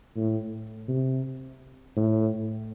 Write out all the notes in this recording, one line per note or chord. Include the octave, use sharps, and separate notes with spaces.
A2
C3
A2